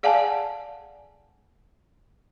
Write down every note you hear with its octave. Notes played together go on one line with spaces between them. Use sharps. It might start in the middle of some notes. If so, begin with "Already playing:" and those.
G#4 D5 F5 F#5 G#5 A5